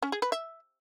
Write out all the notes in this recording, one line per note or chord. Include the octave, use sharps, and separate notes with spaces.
C#4
G#4
B4
E5